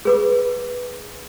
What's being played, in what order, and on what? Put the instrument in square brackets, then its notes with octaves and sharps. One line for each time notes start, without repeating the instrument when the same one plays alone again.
[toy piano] G#4 B4 D6